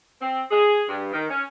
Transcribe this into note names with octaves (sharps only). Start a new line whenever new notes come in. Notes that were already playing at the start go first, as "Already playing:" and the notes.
C4
G#4
G2
D#3
C#4